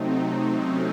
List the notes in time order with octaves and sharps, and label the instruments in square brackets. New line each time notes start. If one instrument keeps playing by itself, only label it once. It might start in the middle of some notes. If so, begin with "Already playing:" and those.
Already playing: [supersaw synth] C3 F#3 A3 C4 D#4
C#4